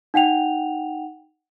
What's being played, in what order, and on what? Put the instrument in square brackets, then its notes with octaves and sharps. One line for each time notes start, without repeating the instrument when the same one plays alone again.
[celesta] D#4 F#5 G5 F7